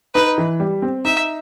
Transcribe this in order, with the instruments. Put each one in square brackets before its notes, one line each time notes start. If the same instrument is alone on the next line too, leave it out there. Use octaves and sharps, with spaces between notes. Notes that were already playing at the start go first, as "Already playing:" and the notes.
[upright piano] D#4 [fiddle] B4
[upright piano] E3
G3
C4
[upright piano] D#4 [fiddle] E5